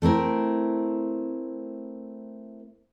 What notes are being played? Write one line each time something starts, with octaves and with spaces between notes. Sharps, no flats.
A3 C4 E4 A#4